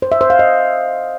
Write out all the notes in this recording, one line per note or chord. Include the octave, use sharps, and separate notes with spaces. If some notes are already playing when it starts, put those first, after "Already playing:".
C5
E5
C5
F5
D#5